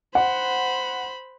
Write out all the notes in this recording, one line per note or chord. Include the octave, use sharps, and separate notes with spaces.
C5 F#5 B5